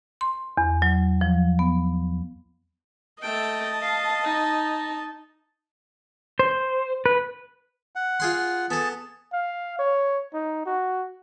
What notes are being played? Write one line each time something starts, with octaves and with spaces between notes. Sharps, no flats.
C6
E2
F#3
F3
B3
A3 D#5 G5 A5
F5
D#4
C5
B4
F#5
F4 G#4 C6
F#5
B3 G#4 A4 A5
F5
C#5
D#4
F#4